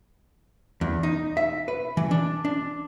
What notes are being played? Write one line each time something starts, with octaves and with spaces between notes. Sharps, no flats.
E2
D#4
E5
B4
E3
D4
D4